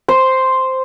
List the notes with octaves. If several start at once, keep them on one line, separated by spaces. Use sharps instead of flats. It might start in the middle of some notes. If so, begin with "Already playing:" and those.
C5